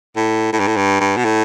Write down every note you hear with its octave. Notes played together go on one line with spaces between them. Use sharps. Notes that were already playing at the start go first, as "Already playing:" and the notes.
A2
A2
G2
A2
G2
G2
B2
A2